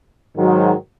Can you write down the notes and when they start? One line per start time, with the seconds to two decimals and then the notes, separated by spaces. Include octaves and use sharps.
0.36 G#2 D#3 F#3